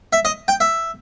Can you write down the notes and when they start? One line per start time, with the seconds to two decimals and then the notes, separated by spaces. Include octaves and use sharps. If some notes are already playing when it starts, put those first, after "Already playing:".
0.13 E5
0.25 D#5
0.48 G5
0.60 E5